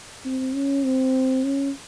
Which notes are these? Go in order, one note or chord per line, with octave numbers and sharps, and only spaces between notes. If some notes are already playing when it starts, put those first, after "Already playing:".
C4
C#4
C4
C#4